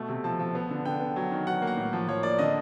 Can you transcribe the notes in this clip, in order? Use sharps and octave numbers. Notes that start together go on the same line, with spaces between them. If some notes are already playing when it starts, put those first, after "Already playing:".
Already playing: B2 A3
C3
F3 A5
F3
B3
D3
D3 G5
B3
F#3
D#3
F#3 F#5
A#3
F#5
A2
F3
F3 C#5
A#3 D5
D3 D#5